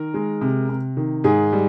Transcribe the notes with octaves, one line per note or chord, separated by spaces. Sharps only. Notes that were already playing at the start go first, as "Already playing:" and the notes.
Already playing: D#3 A#4
G#3
C3
C3
D#3
G#2 G#4
G3